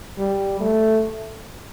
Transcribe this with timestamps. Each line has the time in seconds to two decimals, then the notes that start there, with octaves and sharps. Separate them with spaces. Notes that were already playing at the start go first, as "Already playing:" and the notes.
0.19 G3
0.60 A3